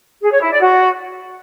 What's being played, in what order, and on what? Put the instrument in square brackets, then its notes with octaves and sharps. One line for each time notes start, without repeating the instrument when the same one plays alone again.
[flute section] G#4
C#5
E4
D5
F#4